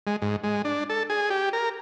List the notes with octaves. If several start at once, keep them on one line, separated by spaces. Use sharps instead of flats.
G#3
G#2
G#3
D4
A4
G#4
G4
A#4